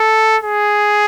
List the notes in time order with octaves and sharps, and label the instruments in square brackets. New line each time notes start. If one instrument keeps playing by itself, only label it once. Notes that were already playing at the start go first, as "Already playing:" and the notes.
Already playing: [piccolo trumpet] A4
G#4